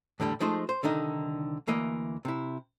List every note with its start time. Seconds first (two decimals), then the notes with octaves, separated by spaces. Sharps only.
0.20 E2 A2 D3 G3
0.40 F3 G#3 A3 D#4 G#4 C5
0.69 C5
0.83 C2 D3 D#3 D#4
1.67 D2 E3 A#3 D#5
2.25 C3 E4